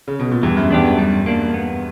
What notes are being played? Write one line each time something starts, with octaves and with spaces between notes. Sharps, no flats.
C#3
B2
A#2
E2 G2 E3
F#2
E2 B3 D4 G4
F#2
E2 G3
A#3 D4
B3